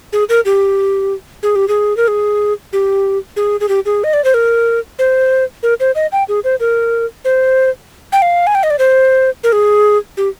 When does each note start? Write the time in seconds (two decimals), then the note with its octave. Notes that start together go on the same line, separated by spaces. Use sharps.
0.13 G#4
0.29 A#4
0.45 G4
1.43 G#4
1.56 G4
1.68 G#4
1.97 A#4
2.08 G#4
2.73 G4
3.36 G#4
3.60 G#4
3.69 G4
3.86 G#4
4.04 D#5
4.14 D5
4.24 C5
4.34 A#4
4.99 C5
5.63 A#4
5.80 C5
5.95 D#5
6.12 G5
6.28 G#4
6.44 C5
6.60 A#4
7.25 C5
8.12 G5
8.22 F5
8.47 G#5
8.55 G5
8.63 D#5
8.70 D5
8.79 C5
9.44 A#4
9.52 G#4
10.17 G4